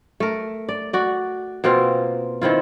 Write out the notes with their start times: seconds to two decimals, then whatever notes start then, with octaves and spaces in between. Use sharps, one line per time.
0.20 A3 A#4
0.69 D5
0.93 F#4 D5
1.64 B2 A#3 C4 F4
2.41 D#3 C4 E4 F4